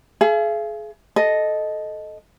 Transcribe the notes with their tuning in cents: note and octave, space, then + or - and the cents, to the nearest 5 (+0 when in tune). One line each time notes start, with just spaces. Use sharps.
G#4 +35 F5 -45
A4 -10 D#5 +0